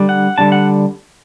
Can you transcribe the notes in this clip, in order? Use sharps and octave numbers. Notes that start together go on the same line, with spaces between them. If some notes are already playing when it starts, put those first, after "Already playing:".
Already playing: D3 G3 D4
F#5
D3 G3 D4 A5
F#5